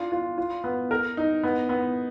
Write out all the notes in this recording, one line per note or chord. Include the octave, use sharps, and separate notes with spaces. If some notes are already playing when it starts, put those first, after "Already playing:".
Already playing: D4 F4
F4
F4
B3
A#4
D#4
B3
B3